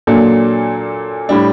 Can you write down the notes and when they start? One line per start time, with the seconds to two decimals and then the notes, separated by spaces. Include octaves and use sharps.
0.07 A#2 F#3 A#3 D4 A4
1.29 A2 G3 D4